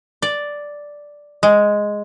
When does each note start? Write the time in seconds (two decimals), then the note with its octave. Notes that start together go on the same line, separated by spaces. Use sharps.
0.22 D5
1.43 G#3